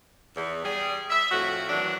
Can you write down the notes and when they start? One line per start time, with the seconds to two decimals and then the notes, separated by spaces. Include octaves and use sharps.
0.35 E2
0.63 G3 G#4
1.10 E5
1.30 F2 A2 F#4
1.69 D#3 E3 F#3 D4